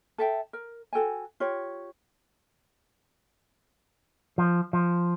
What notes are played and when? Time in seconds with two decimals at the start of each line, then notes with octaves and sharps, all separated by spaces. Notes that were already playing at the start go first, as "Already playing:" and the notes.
0.18 A4 E5 G5
0.53 A#4
0.93 F#4 A4 G5 G#5
1.40 F4 G4 C#5
4.38 F3
4.73 F3